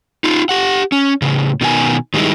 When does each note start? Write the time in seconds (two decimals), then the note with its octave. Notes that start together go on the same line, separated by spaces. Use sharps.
0.24 D#4 F4
0.49 G4 F#5
0.92 C#4
1.22 A2 C#3
1.61 B2 D#3 E4 G#5
2.14 D#3 G3 G#3 B3 D#4 E4